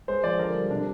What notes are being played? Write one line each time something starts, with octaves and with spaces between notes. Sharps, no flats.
G#3 C5
F3 D5
D3 A#4
G3
C3 D4